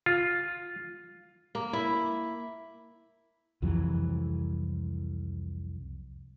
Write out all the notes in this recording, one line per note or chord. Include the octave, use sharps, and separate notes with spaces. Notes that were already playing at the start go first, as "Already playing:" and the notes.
F4
A#3
E4
C2 F2 E3 F#3